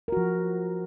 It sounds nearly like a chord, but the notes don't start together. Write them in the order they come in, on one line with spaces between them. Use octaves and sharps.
A#4 F#4 F3